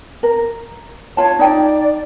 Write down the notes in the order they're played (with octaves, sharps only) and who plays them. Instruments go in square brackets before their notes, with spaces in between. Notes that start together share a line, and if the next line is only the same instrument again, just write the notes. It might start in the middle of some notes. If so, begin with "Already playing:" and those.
[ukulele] A#4
[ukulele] F4 A5 [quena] C#5
[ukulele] D#4 G5 [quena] D5